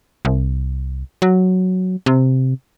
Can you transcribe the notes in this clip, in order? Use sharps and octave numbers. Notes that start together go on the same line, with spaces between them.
C2
F#3
C3